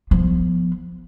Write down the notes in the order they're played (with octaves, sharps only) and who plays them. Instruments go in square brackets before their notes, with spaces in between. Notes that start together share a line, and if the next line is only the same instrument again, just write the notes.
[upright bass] F3 B3